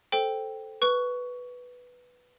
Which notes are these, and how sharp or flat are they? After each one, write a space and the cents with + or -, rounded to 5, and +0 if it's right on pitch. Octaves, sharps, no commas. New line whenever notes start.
A4 +0 C5 +0 G5 +0
B4 +0 C#6 +15